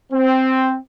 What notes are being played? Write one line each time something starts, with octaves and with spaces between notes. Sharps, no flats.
C4